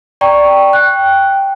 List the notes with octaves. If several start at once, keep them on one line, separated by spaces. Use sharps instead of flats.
D5 G5 A#5 C#6
G5 F#6